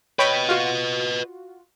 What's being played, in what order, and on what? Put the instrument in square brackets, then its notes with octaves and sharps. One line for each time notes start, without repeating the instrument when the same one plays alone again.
[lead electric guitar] B4 D#5 [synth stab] C#5 G5 B5
[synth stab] F4 F#4